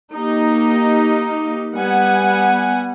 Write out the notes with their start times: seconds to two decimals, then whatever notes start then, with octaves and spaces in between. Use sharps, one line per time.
0.13 A#3 D#4 G4
1.76 G3 B3 F#5 G#5